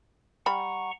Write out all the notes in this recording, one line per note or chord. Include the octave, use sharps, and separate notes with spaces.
G3 F#5 A#5 B5 C#6